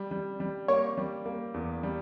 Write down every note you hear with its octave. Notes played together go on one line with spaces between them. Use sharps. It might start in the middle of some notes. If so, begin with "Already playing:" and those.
Already playing: G3
G3
G3
A#3 C#5
G3
A#3
E2
G3